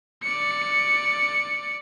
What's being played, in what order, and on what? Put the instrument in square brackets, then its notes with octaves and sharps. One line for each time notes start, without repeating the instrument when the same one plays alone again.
[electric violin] D5 C#7